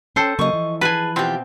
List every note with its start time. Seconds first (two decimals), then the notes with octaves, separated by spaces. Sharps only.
0.16 C#4 A4 C5 G5
0.39 C#3 F#3 A#3 D#5 C#6
0.53 E3 F3
0.81 G#4 B4 G#5 A5
1.16 B2 C4 F4 G4